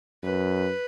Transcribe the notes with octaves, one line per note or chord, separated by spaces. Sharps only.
F#2 B4